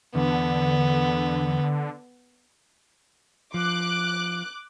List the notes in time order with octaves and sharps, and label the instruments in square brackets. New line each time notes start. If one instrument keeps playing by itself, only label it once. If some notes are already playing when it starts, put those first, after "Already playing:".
[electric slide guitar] E2 [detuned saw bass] D3 [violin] B3
[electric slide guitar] F3 [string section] D6 F#6